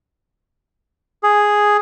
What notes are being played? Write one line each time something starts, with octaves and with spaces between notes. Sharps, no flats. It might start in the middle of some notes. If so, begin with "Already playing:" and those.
G#4